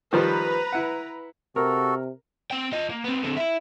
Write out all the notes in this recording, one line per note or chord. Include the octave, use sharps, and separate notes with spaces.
D#3 F3 G3 B4 A#5
E4 F#5
C3 F#4 A4 A#4
C4 G5
F4 D#5
A#3
B3 C4
D3 C4
E4 E5